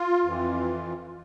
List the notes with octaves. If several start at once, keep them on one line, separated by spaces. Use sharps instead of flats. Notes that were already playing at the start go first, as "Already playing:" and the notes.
Already playing: F4
F2 E3